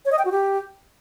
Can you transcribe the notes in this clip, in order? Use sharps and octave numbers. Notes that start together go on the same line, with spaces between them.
C#5
D#5
G5
F#4
G4